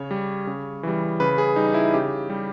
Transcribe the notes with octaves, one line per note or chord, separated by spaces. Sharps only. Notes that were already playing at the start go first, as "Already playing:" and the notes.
Already playing: C#3 C#5
G3
C#3
E3 G3
C#3 B4
G#4
G3 D#4
E4
C#3 G4
G3